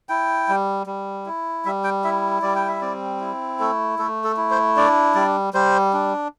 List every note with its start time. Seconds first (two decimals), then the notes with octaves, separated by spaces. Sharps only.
0.09 E4 G5
0.49 G3
0.87 G3
1.26 E4
1.65 G3 E5
1.84 G5
2.04 E4 E5
2.42 G3 D5
2.56 G5
2.68 E5
2.81 C4 D5
3.21 E4
3.60 A3 A4
3.99 A3 A4
4.24 A4
4.37 E4
4.51 C5
4.77 D4 D5
5.15 G3 D5
5.54 G3 C5
5.93 D4